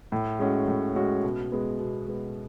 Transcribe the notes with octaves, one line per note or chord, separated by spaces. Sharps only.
A2
G#3 C#4 F#4
A2
G#3 C#4 F#4
B2
G#3 B3
B2
G#3 B3